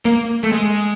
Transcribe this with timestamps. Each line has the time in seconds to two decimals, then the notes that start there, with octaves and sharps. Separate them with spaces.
0.05 A#3
0.43 A3
0.52 G#3